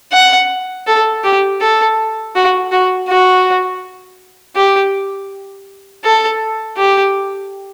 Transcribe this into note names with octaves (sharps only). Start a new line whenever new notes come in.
F#5
A4
G4
A4
F#4
F#4
F#4
G4
A4
G4